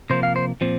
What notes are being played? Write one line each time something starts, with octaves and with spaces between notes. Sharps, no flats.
C3 F3 A#3 C5
F5
C5
A#2 F3 C4